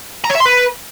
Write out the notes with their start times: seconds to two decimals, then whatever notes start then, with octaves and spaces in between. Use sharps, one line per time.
0.24 A#5
0.30 C#5
0.35 E5
0.40 C6
0.46 B4